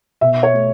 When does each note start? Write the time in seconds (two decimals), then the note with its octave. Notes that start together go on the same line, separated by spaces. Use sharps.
0.21 B2 E5
0.43 C#5
0.54 A3